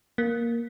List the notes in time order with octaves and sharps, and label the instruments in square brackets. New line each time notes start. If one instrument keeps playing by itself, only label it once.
[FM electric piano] A#3